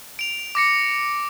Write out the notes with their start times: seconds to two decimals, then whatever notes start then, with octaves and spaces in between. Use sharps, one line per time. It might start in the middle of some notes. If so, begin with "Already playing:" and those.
0.19 D7 F7
0.55 D6 A#6 C#7